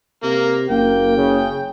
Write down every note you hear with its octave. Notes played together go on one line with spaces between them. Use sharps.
C3 A#3
F#1 A#3 G5
C#3